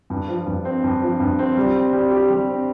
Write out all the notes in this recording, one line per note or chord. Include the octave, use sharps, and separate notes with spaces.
G2
F3
G2
C4
G2
F3
G2
C4
G3
C4
G3
G4
G3
C4